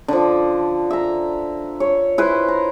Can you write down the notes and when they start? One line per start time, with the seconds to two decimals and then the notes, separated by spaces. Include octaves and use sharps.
0.08 D3 F3
0.91 E5 A#5
1.80 C#5
2.18 E4 B4 C5
2.48 A#5